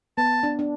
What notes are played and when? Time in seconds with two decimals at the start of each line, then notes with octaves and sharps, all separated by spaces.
0.18 B3 A5
0.43 D4
0.59 D4